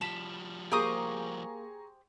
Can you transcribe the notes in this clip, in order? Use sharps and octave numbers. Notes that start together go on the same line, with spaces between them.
F3 G3 A5 B5 E7
A#3 G4 G#4 C5 A#5 C#6 D#6